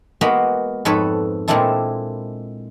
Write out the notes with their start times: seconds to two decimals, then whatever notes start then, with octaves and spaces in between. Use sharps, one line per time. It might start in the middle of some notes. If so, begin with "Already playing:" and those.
0.21 G#3 A#3 B3 F#4 B5
0.85 F2 G#2 A4 B4 C#5 B5
1.48 A#2 G#3 C4 D4 E4 A4